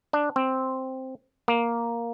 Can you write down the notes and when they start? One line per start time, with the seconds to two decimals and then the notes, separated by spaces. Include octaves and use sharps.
0.13 D4
0.36 C4
1.48 A#3